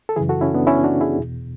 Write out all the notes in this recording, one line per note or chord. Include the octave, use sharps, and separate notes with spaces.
A4
F#2 C#3 E3 E4 G#4
F#4 A4
C#4 E4
B3 D4
C#4 E4
D4 F#4
E4 G#4
E2 B2